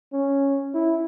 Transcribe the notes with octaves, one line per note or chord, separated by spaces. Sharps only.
C#4
E4